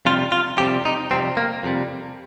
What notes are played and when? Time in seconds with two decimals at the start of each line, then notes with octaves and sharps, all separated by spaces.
0.05 F2 C3 G3 F4
0.32 F4
0.58 F2 C3 G3 G4
0.85 D#4
1.11 F2 C3 G3 C4
1.37 A#3
1.63 F2 C3 G3